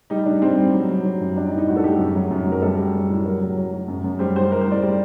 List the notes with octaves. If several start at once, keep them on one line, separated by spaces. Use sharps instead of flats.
G3 D#4
G3 D4
G3 C4
G3
F#3
F#3
F#3
F#2
G3 D4
D#4
A2
D#4
A2 F#4
A4
G3 G4
F#2
F#3
F#2
F#2 A#4
G3 A4
G3
G3
A2
F#3 A#4
F#3
F#3
F#3
F#2
F#2
G3 C5
G3 C5
G3 A#4
C5
A2 D5
G3